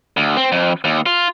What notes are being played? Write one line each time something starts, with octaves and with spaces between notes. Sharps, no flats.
D2
C4
F2
D#2
F4